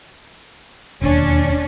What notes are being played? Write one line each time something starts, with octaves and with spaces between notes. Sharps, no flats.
E1 D#2 C#4 D4